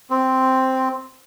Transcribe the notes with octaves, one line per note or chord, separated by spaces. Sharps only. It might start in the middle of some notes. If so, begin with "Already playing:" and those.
C4